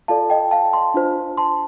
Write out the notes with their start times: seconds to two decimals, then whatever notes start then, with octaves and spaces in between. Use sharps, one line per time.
0.08 F4 A4 D5 F5 A5
0.30 D#5 G5
0.51 F5 A5
0.73 A5 C6
0.94 D4 F4 C5
1.37 A5 C6